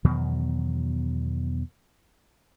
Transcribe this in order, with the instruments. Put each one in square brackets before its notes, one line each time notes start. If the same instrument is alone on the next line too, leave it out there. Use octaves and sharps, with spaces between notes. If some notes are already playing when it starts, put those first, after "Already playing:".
[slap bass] E2 B2 D#3 F#3